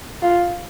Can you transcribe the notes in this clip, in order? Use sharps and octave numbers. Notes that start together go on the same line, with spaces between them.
F4